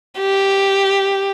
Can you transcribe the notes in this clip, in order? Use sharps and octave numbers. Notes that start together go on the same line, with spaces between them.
G4